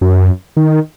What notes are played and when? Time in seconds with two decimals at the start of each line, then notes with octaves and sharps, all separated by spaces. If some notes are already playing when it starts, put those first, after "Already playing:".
0.01 F#2
0.57 D#3